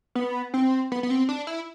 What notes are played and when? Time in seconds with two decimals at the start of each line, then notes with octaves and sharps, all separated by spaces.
0.15 B3
0.54 C4
0.92 B3
1.03 B3
1.10 C4
1.29 D4
1.47 E4